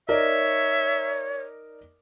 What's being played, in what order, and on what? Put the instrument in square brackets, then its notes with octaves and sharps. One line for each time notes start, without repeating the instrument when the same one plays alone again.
[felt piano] D#4 A#4 D5 [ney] C#5 [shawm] E5